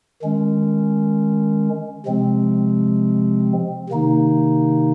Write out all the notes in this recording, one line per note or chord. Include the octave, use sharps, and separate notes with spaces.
D#3 G#3 C#4
C3 F3 G#3 C4
C3 D#3 A#3 D#4